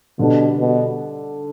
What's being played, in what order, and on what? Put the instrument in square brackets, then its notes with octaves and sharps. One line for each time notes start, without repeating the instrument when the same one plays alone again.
[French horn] B2 [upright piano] D3 G3 D4 A4
[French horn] B2